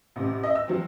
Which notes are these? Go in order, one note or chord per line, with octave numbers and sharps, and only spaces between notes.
A1 C3
D#5 E5
E6
F3 F#3 C4